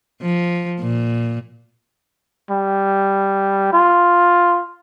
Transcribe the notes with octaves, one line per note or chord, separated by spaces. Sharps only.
F3
A#2
G3
F4